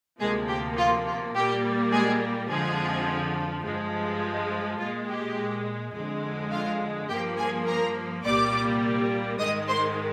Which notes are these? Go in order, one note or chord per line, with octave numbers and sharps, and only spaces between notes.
D2 C3 F3 G#3 A#3 G#4
G4
F4
F4
A#2 G3 A#3 G4
G#3 G#4
F2 D3 F3 G#3 G#4
G2 F3 G#3
A#2 G#3 F4
G4
F2 D3 G#3
F4 F5
G2 F3 A#3 G4 G5
G#4 G#5
A#4 A#5
C2 A#2 G3 A#3 D5 D6
G#2 D#3 G#3 D#5 D#6
C5 C6